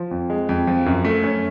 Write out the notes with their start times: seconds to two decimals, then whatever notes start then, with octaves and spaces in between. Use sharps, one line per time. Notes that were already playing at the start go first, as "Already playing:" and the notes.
Already playing: F3
0.11 F2
0.30 G#3
0.49 F2
0.67 F3
0.86 F#2
1.05 A3
1.24 C#4